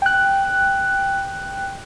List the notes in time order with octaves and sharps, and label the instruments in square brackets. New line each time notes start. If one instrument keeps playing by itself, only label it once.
[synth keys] G5 F#6